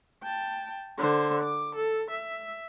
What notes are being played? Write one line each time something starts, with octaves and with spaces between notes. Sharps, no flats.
G5 A5
D3 C5
D6
A4
E5